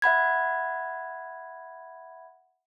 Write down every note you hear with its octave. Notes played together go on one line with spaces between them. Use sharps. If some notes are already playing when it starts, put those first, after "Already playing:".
E5 F#5 B5 G#6